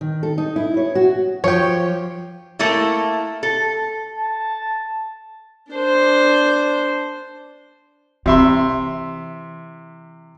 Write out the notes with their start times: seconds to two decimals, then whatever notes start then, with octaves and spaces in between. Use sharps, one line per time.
0.01 D#3
0.23 A4
0.38 D#4
0.56 E4
0.77 C#5
0.95 F#4
1.44 F3 G4 C#5
2.59 A3 A#3 E4
3.43 A4
4.18 A5
5.72 D4 C5
8.26 C3 E3 E5 C6